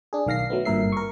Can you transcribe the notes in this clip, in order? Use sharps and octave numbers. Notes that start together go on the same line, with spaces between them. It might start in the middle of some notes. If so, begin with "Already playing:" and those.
D4 G#4
B1 D#3 F5 A#6 C7
F#3 A3 B3
G#1 G2 A#2 A#4 E5 C7
A#4 C#6